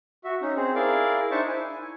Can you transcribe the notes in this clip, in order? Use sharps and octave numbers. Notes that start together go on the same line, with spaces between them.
F#4 E5
C#4 D#4
C4 G#4 C5
E4 G#4 A#4 D5 F5
D4 D#4 C5 E5 A5 C#6
E4 G#5